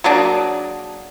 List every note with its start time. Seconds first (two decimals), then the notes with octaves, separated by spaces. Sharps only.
0.04 F#3 A#3 D4 G#4